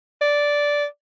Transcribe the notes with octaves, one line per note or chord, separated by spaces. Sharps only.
D5